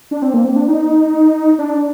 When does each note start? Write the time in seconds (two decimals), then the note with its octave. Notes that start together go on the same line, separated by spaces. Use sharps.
0.11 D4
0.22 C4
0.34 A#3
0.45 C4
0.56 D4
0.68 D#4
1.59 D4